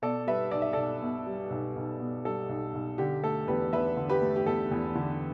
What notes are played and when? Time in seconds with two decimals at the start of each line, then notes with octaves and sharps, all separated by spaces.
0.02 B2 A4 D5
0.27 G3 B4 E5
0.51 B1 D5
0.62 E5
0.73 B1 A4 D5
1.02 B2
1.27 G3
1.50 B1
1.76 B1
2.00 B2
2.25 G3 A4
2.49 B1
2.74 B1
2.98 D3 G4
3.23 A3 A4
3.47 E2 G4 B4
3.73 E2 B4 E5
3.97 D3
4.09 G4 B4
4.21 A3
4.36 G4
4.46 E2 A4
4.71 E2
4.95 D3